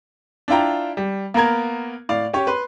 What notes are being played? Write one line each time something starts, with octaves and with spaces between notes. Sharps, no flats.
D4 E4 F4 G5 A#5
G3
A#3 B3 A#4 G#6
A2 D5 F5
C#4 G4 C#5
B4 C6